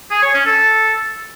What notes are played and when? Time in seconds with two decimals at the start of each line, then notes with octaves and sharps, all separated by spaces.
0.10 G#4
0.22 C#5
0.34 C#4
0.45 A4